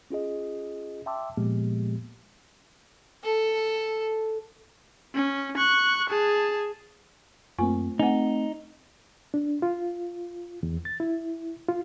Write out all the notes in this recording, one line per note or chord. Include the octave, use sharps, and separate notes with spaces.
C#4 F4 G#4 D#5
E5 G5 A5 C6 D6 E6
A#2 F3 G#3 A#3 B3 G4
A4
C#4
C#6 F#6
G#4 A5
F#2 A3 A#3 C4 F4 G#5
A3 C4 D#4 F#5 G#5
D4
F4
E2
A6
E4
F4